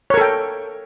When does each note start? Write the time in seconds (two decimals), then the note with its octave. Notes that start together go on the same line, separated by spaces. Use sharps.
0.10 C#5
0.14 A#4
0.18 A4
0.21 G5